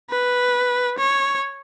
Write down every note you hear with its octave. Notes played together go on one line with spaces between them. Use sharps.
B4
C#5